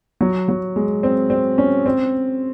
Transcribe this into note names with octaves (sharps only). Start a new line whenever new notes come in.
F#3
F#3
G#3
C4
C4
C#4
C4